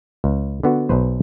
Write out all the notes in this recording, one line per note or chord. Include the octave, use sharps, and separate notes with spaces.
C#2
D3 B3 F#4
B1 B2 B4 C5